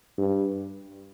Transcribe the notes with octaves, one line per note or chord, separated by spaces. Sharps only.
G2